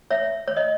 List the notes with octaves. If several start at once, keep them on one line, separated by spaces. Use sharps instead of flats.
C#5 E5
C#5
D#5